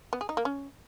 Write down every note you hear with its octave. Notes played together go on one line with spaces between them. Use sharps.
B3
G#4
D#4
A#3
C#4